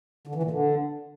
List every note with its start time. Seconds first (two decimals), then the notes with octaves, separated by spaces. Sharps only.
0.27 D3
0.35 E3
0.43 A#2
0.51 D3